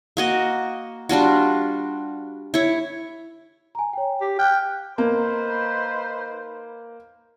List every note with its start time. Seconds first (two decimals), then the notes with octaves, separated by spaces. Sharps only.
0.17 A#3 F#4 D#5
1.09 G3 D4 F4 F#4
2.54 E4 C#5
3.75 G#5 A#5
3.93 C#5 G5
4.21 G4
4.39 G5 F6 F#6
4.98 A#3 D#4 B4 C5